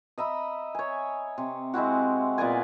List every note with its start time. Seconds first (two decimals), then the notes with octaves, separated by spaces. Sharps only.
0.18 D#5 E5 A#5 B5
0.75 C#5 G#5
1.38 C3
1.74 G#3 C4 E4 F#4
2.38 A#2 B3 D5 G#5